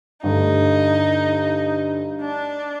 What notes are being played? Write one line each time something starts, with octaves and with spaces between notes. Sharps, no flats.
G2 D3 A3 D#4
D4